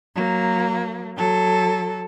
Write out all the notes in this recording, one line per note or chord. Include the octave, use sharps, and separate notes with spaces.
F#3 A#3
F#3 A4